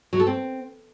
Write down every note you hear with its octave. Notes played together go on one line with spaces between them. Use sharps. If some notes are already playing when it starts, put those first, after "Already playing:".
F#3
A4
C4